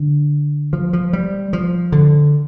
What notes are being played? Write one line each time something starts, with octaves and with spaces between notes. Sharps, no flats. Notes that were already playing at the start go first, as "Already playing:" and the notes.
Already playing: D3
F3
F3
G3
F3
D3